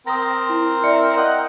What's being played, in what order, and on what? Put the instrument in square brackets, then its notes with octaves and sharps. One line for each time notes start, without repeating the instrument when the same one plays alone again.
[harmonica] C4 A#4 [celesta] D#6 A#6
[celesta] E4
D5 E5 C#7
[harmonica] D#5 F#5 G5